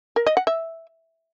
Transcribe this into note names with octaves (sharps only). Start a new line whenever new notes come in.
A#4
D#5
F#5
E5